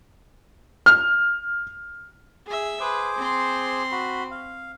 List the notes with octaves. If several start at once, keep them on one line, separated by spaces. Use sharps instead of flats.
F6
G#4 E5
G#4 B4 C5 D6
C4 C6
F#4 B5
F5